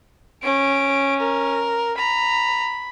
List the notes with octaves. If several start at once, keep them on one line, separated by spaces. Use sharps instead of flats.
C#4 D7
A#4
A#5 B5